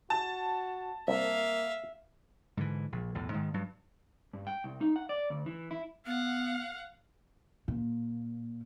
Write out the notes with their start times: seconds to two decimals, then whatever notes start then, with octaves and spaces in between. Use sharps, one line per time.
0.10 F#4 A5
1.08 C2 A#3 E5 F5
2.57 G#2 D3 E3
2.92 A#1
3.15 B1 E2 A2
3.34 G#2 D#3 G#3
3.54 G2 F#3
4.33 G2
4.47 G5
4.64 C2
4.81 D#4
4.96 F#5
5.09 D5
5.30 D2
5.46 E3
5.71 E4
6.06 B3 F5 F#5
7.68 A#2